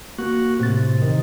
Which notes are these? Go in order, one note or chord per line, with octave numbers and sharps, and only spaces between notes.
A#3 F#4
A2 C3 A6
C3 D#3